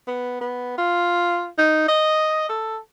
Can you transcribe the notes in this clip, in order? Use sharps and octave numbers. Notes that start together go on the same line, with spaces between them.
B3
B3
F4
D#4
D#5
A4